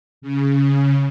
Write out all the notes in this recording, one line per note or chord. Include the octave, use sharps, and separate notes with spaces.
C#3
C#3